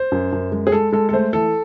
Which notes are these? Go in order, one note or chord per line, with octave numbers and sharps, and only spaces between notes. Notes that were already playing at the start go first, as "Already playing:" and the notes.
Already playing: C5
F#2
F#2
G#3
G#4
G#3 A4
G#3 A4
A4
A3 C5
E3 A4